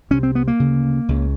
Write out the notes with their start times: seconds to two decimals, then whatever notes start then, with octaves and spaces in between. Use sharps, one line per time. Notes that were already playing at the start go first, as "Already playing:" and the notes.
0.10 C2 C3 C#4
0.23 C4
0.35 B3
0.48 A#3
0.60 D2 C#3
1.08 C#2 C#3